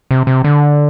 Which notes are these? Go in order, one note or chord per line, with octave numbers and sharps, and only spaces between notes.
C3
C3
D3